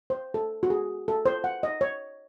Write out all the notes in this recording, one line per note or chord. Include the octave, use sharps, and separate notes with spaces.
C5
A4
F#4
G#4
A4
C5
F#5
D#5
C#5